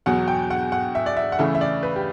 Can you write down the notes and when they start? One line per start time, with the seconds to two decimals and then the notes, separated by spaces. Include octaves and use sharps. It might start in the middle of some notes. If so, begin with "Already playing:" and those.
0.06 E2 B2 F#3 F#5
0.28 G5
0.50 F#5
0.72 F#5
0.95 E5
1.06 D5
1.17 E5
1.32 F#5
1.39 C#3 E3 A3 E5
1.55 E5
1.61 D5
1.83 B4
1.96 G4